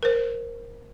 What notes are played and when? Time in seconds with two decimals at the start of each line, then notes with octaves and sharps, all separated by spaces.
0.03 A#4 C5